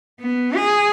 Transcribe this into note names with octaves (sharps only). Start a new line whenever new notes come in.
B3
G#4